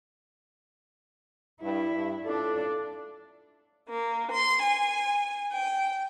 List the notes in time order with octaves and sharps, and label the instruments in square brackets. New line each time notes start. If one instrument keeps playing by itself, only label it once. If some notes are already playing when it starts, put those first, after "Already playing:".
[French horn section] G2 [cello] E4
[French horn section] G2
[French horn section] A2 F4 A4 [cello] D4 D5
[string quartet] A#3
C6
G#5
G5